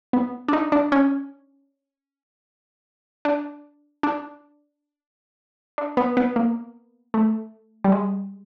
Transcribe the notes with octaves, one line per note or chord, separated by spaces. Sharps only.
B3
D4
D#4
D4
C#4
D4
D4
D4
B3
B3
A#3
A3
G3
G#3